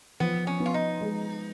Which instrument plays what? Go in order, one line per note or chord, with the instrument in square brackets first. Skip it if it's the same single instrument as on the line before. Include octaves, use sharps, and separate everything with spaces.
[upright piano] F3 [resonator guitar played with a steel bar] B3
[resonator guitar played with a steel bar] C#4
[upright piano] B3
[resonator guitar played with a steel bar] F4
D#4
[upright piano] G#3